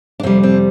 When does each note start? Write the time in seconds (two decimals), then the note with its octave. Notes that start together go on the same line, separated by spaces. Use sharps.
0.20 D4
0.23 F2 C3 G3 C4
0.43 C4